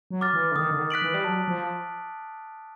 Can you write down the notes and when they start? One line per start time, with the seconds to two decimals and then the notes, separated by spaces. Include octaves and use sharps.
0.11 F#3
0.21 D6 F6 A6
0.33 E3
0.51 D3
0.56 D#3 D#6
0.71 D3
0.79 D#3
0.90 F#6 B6 D7 F#7
1.02 E3
1.14 G3
1.24 F#3 A5
1.48 F3